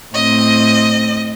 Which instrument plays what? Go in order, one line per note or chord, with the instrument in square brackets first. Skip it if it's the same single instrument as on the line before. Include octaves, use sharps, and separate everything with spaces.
[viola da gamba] A2 C4 [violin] D#5